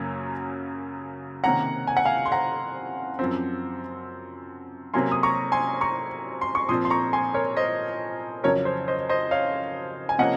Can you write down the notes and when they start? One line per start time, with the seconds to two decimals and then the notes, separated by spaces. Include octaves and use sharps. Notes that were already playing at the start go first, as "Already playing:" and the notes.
Already playing: F#2 C#3 F#3 A#3 C#4
1.44 C3 D#3 A#3 C#4 F#5 A#5
1.87 G#5
1.97 F#5
2.05 F5 G#5
2.25 C6
2.32 F#5 A#5
3.19 F#2 F3 C4
4.94 C3 F#3 A#3 C#4 G#5 C6
5.12 D#6
5.23 A#5 C#6
5.52 G#5 C6
5.81 A#5 C#6
6.41 C6
6.55 C#6
6.69 A#2 F3 C4 C6 D#6
6.85 C6
6.90 A#5 C#6
7.13 G#5 C6
7.34 A#4 C#5
7.57 C5 D#5
8.44 F2 C#3 F#3 C#4 A#4 C#5
8.65 C5
8.88 C5 D#5
9.09 C5 D#5
9.31 C#5 F5
10.09 G#5
10.19 C3 F3 A#3 C#4 D#5 F#5